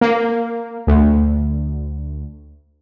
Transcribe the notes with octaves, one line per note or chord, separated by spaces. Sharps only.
A#3
D2